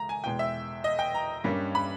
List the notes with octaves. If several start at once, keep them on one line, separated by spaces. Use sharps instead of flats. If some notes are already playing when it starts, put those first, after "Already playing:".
Already playing: C#2 A#5
G#5
E2 B2 G#3 G5
E5
D#5
G5
A#5
G2 G3 A#3 C#4
B5